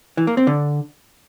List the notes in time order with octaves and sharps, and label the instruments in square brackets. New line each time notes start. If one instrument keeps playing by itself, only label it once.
[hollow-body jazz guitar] E3
A#3
C4
D3